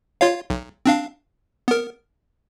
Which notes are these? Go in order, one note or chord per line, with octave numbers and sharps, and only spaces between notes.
F4 C#5 F5
B1
C4 D4 F5
B3 A#4